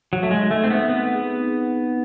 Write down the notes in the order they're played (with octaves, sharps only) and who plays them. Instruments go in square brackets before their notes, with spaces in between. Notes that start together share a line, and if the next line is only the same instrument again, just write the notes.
[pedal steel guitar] F#3 [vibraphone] G#4
[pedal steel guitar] A3
G#3
[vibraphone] D#4
[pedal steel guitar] A3
[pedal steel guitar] C4 [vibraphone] D#4
[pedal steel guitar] B3
[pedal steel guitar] B3 [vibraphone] C4
[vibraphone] G#4
D#4
C4